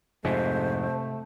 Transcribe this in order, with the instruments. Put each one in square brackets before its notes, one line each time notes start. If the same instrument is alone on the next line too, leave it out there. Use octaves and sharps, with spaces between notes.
[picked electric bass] F2 G#2 [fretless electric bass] C3 [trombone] A3 [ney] C5